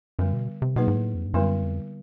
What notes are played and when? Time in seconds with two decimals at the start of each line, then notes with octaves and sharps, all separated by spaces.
0.19 F#2 D3 G3 B3
0.33 B2
0.62 C3
0.76 B2 F#3 A#3 D#4 G#4 B4
0.88 G#2
0.95 A2
1.15 F2
1.26 G2
1.34 F#2 D3 G3 B3 E4
1.62 F2